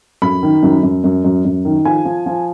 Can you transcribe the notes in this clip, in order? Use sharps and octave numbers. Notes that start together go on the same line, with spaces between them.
F#2 B5
D#3
F#2
F#2
F#2
F#2
F#2
D#3
F3 G#5
F3
F3